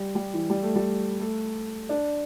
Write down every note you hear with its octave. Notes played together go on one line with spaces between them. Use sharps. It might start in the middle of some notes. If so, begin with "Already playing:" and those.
Already playing: G3
G3
E3
G3
A3
G3
A3
D4